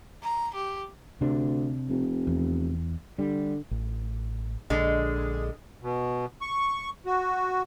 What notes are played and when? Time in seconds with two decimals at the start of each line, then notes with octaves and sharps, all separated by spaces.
0.23 A#5
0.55 G4
1.21 D2 C3 D4
1.89 F1
2.27 E2
3.19 D3 G3
3.71 A1
4.70 A#1 D3 G#3
5.83 B2
6.41 C#6
7.06 F#4